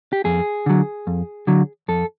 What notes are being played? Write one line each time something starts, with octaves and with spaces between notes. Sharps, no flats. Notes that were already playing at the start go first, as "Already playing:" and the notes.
G4
F2 G#4
D3 F#3
F2
D3 F#3
F2 A4